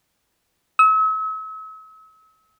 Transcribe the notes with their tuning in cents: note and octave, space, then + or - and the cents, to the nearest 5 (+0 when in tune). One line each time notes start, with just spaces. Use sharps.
E6 -40